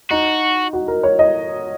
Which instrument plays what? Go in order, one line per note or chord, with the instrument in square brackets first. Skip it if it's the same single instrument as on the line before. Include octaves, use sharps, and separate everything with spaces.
[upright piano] D#4 [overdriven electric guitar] F#4
[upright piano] F#4
A#4
C#5
D#5